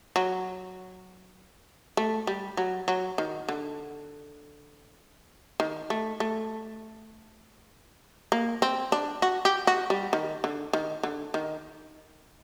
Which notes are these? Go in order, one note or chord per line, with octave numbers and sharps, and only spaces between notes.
F#3
A3
G3
F#3
F#3
D#3
D3
D#3
A3
A3
A#3
C4
D4
F#4
G4
F#4
G3
D#3
D3
D#3
D3
D#3